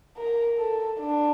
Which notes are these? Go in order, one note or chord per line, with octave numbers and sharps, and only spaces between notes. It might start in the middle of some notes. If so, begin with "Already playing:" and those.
A#4
A4
D4